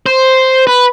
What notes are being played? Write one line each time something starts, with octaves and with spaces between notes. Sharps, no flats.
C5
B4